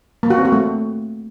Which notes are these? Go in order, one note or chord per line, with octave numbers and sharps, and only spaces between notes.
A#3
F#4
C4
F#4
A3